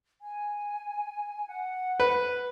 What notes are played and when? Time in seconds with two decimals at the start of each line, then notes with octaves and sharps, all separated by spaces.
0.21 G#5
1.48 F#5
2.00 B4